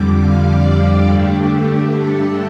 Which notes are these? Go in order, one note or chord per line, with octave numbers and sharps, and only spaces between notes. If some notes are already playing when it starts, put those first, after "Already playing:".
Already playing: F2 D3 G3 D6
F5
D5
G4
G2 D3 A3 D4
A4